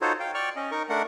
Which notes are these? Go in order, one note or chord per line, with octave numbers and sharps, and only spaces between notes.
D#4 F4 F#4 A4 C5 C#5
F5 G5
D5 G5 C#6 F6
C#4 D#5
D#4 A#4 C#6
A3 D4 A#4 F#5